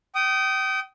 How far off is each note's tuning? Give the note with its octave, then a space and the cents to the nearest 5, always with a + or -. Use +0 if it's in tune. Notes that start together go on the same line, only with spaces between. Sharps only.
G5 -30 D#6 +0